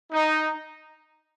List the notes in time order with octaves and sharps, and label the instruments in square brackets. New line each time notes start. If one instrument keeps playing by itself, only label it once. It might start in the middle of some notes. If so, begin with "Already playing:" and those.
[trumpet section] D#4